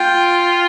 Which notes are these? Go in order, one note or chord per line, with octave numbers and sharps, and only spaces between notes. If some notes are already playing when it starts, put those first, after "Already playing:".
Already playing: F4 G5